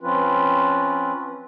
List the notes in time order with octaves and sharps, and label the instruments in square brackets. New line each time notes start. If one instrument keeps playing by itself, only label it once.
[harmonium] F3 C4 C#4 F4 B4